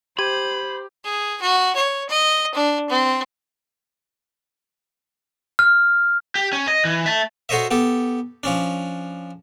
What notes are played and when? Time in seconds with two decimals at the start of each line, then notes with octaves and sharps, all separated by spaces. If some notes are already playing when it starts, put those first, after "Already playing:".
0.19 G4 C5 B5 G#6 D#7 F#7
1.04 G#4
1.42 F#4
1.76 C#5
2.10 D#5
2.54 D4
2.90 C4
5.59 F6
6.35 G4
6.53 C#4
6.68 D#5
6.85 E3
7.06 E5 A5
7.49 F#4 A4 C5 C#5 D#5 E5
7.71 B3 G4 A4
8.43 F3 C#4 D4